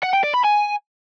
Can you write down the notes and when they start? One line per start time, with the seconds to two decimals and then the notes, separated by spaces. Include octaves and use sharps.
0.03 F#5
0.13 G5
0.24 D5
0.34 B5
0.44 G#5